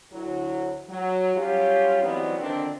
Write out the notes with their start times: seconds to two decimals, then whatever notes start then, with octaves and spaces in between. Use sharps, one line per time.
0.12 D2 F#3 E4
0.89 F#3
1.36 F#3 G3 C#4 F4 G4
2.02 E3 F#3 G3 B3 C4 D#4
2.38 D3 D#3 F3 C4 D4